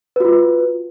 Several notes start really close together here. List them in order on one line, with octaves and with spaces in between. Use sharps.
B4 F#4 F4